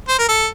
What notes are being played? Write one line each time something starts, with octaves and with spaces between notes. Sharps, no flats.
C5
A#4
A4